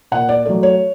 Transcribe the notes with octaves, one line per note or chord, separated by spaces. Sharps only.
A#2 F#5
D5
F#3 A3 D5
C#5